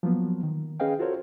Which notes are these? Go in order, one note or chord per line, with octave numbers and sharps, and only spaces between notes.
F3 F#3 A#3 B3
D#3
C#4 G#4 B4 D#5 F5 G5
F4 F#4 A4 A#4 C5 C#5